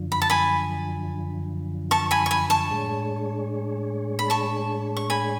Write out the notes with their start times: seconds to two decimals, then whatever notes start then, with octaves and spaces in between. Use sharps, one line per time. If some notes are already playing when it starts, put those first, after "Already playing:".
Already playing: F#2 D3 F3
0.12 B5
0.22 A5
0.30 G#5 B5
1.91 A5 C#6
2.11 G#5 B5
2.26 C#6
2.31 G#5 B5
2.50 A5 C#6
2.70 A2 G#3 D4 G#4 C#5
4.19 B5
4.30 A5 C#6
4.97 C#6
5.10 G#5 B5